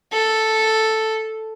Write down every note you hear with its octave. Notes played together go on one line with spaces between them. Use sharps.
A4